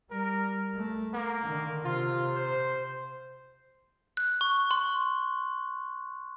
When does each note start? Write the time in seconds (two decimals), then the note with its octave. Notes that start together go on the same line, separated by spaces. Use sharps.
0.11 G3 A#4
0.75 A3
1.13 A#3
1.43 D3 D#3
1.85 C3 F4
2.35 C5
4.17 F#6
4.41 C#6
4.71 C6